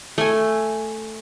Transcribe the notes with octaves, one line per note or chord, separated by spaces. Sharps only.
A3 G#5